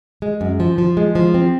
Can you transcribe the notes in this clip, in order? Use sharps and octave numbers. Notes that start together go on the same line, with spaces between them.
G#3
F#2
F3
F3
G#3
F3
C4